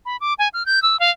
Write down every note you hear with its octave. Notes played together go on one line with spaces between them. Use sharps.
B5
D6
G#5
F6
G6
E6
F5